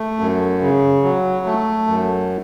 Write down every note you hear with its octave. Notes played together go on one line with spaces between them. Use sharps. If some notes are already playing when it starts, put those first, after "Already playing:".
Already playing: A3
F#2
C#3
F#3
A3
F#2